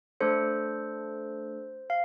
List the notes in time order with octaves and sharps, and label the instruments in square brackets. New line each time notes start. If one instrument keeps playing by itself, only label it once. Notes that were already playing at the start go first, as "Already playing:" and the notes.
[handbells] A3 D4 A4 C5
F5